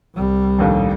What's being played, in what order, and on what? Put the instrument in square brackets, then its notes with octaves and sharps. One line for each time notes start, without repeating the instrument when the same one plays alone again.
[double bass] C2 G3
[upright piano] A#1 D#2 A2